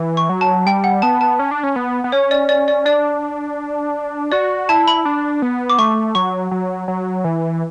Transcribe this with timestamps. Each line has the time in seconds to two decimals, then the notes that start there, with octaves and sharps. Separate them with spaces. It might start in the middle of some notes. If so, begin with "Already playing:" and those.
Already playing: E3
0.17 C#6
0.29 F#3
0.41 A5
0.66 G3 G5
0.84 F#5
1.02 B3 A5
1.21 A5
1.39 C#4
1.51 D4
1.63 C#4
1.76 B3
2.04 B3
2.12 C#4 C#5
2.31 D5
2.49 D5
2.68 D5
2.85 D4 D5
4.32 F#4 D5
4.69 E4 A5
4.88 B5
5.05 D4
5.42 B3
5.70 D6
5.78 A3 C#6
6.15 F#3 C#6
6.51 F#3
6.88 F#3
7.24 E3